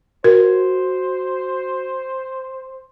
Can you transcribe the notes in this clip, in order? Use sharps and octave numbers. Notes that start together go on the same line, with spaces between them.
F#4 A#4 C5